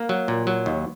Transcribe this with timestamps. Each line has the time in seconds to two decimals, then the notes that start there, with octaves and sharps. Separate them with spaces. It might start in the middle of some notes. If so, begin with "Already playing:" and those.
Already playing: A#3
0.09 F#3
0.28 A#2
0.47 F#3
0.66 D#2